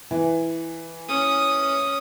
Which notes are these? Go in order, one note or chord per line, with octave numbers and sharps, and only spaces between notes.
E3
C#4 D#6